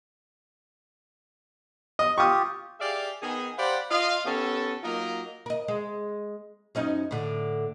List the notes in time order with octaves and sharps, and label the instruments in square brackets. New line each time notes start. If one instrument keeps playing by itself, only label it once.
[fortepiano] D#5
[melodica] F4 G4 [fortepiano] C#6 D#6
[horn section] G4 G#4 D5 E5 F5
D#3 B3 D#4 G#4
G4 C5 D5 F5 F#5 B5
F4 D#5 F5
D#3 B3 C#4 G4 A4
F#3 A#3 D#4 F4 A#4 D#5
[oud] A#4 D#5
G#3
F#2 C#4 D#4
A2 D3